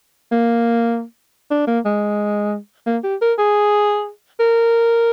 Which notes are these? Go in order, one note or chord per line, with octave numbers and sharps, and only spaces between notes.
A#3
D4
A#3
G#3
A#3
G4
A#4
G#4
A#4